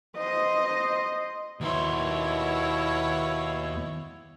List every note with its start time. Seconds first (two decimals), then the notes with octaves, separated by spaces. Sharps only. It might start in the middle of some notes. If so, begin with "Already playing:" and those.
0.17 C5 D#5
1.61 D#2 B2 E4 C#5 C6